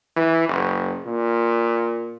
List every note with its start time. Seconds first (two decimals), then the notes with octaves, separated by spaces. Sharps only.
0.17 E3
0.49 F#1
1.06 A#2